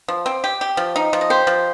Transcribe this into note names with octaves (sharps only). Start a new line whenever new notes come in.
F3
C4
G4
G4
F3
D#4
F3
D#5
G4 C5
F3